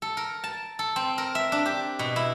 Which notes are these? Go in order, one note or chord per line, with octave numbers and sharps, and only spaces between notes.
A4
A#4
A5
A4
C4
A#4
E5
D4
G4
B2
E4